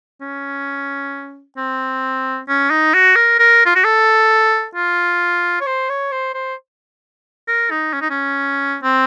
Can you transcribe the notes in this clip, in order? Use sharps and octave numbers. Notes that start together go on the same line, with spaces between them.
C#4
C4
C#4
D#4
F#4
A#4
A#4
F4
F#4
A4
F4
C#5
C5
C#5
C5
C5
A#4
D#4
C#4
D#4
C#4
C4